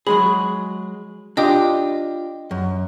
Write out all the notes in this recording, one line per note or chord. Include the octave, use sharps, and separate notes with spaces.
F#3 G#3 G#4 B5
D4 F4 G4 D#5 G5 D#6
F#2